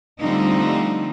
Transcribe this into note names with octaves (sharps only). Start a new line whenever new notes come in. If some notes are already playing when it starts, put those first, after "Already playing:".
D3 F3 G3 A3 C4 D#4